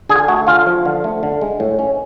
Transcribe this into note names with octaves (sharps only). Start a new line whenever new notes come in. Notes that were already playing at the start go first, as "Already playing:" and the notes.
D3 G#4 G#5
G#5
A3 F#4 F#5
D3 F4 F5
F3
D3
A3
D3
G#3
A2
C#4